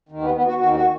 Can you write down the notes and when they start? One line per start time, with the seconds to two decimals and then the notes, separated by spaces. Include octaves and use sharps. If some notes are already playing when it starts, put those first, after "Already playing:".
0.09 D#2 D#3
0.21 B3
0.34 B3
0.46 F#4
0.58 D#2 D#3 F#4
0.75 F#4